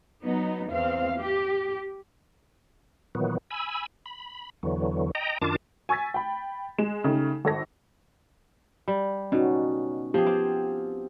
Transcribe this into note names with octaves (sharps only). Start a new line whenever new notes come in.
F#3 B3 D#4
E2 C4 F5
G4
A#2 D#3 E3 F#3 B3
G#5 B5 E6
B5
E2 D3 E3 F#3
D#5 G5 A#5
F#2 D#3 D4 F4 A5 D6
G#5 C#6 E6 A6 B6
G5 B5
G#3 E7
C#3 A3 D#4 G4
G#1 A4 A#6
G3
B2 C#4 D#4 F#4
F3 B3 G4 G#4
C4 F4